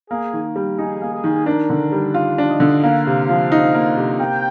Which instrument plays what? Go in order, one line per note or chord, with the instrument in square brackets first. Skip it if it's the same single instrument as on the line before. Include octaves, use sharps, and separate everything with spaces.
[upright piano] A#3 [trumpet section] G#4
[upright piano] D#3
G3
[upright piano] D#4 [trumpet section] G#4
[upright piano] A#3
[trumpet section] G#4
[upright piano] D#3
[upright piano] D4 [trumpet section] A#4
[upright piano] D3
G3
F4
D4
[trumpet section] D#5
[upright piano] D3
[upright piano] A#3 [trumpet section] F5
[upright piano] C3
F3
D#4
A#3
C3
[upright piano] A#3 [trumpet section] G5